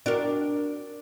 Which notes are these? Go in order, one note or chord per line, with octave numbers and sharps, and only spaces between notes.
D4 F#4 A#4